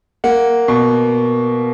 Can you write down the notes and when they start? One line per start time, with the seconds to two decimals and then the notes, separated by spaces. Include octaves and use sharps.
0.24 A#3 F#5
0.68 B2